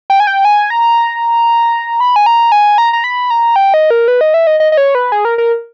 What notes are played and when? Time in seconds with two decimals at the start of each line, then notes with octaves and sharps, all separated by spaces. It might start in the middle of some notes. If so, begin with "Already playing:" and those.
0.10 G5
0.20 G#5
0.27 G5
0.45 G#5
0.70 A#5
2.00 B5
2.16 G#5
2.26 A#5
2.52 G#5
2.78 A#5
2.93 A#5
3.04 B5
3.30 A#5
3.56 G5
3.74 D#5
3.90 A#4
4.08 B4
4.21 D#5
4.34 E5
4.47 D#5
4.60 D#5
4.72 D#5
4.77 C#5
4.95 B4
5.12 G#4
5.25 A#4
5.38 A#4